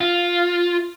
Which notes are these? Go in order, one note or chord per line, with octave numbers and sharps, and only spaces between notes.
F4